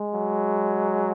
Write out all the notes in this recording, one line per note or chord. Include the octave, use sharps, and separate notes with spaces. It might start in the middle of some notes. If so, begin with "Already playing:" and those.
Already playing: G#3
F#3